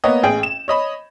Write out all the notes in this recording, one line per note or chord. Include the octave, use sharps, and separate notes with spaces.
A#3 B3 C#5 D#5
A1 G#4 G5
E7
C#5 D#5 B5